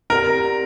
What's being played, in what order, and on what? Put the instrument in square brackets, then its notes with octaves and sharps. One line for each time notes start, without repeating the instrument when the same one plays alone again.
[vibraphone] C4 G4 D5 F#5 [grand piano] A#4